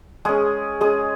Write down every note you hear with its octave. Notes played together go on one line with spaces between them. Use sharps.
G#3 C#4 G#4
G#3 C#4 G#4